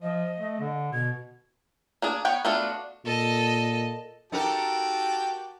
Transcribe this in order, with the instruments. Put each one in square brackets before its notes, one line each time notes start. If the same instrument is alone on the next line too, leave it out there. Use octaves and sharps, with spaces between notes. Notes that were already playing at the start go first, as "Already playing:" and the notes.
[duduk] F3 [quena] D#5
[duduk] A3
D3
[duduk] B2 [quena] G#6
[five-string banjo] A#3 D4 G#4
B3 C#5 F#5 G5
A3 B3 D4 F4 F#4
[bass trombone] A#2 [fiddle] A4 D#5
[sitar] D#4 A4 A#4 [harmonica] F#4 G4 A5